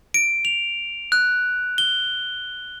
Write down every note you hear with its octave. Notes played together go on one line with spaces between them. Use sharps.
D7
F7
F#6
G7